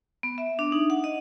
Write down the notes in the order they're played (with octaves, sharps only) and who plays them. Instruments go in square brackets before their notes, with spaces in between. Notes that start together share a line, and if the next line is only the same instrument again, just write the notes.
[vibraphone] B3
E5
D4
D#4
F#5
D#5